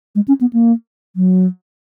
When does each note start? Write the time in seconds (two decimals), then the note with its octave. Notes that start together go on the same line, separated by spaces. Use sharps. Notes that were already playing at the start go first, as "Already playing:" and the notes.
0.15 G#3
0.28 C#4
0.41 B3
0.53 A#3
1.16 F#3